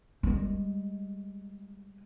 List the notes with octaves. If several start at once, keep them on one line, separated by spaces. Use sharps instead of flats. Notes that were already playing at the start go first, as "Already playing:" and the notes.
G3 G#3